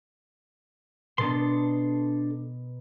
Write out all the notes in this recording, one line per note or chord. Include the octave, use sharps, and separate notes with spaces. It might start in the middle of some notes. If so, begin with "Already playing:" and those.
B2 B3 D4 A4 A#5 C6